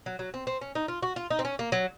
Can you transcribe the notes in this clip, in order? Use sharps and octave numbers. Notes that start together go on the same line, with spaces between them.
F#3
F#3
C4
C4
C#4
D#4
F4
F#4
F4
D#4
C4
C#4
A#3
F#3